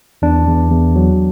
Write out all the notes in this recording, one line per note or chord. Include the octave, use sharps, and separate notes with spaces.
E2 D4
E2
E2
F#3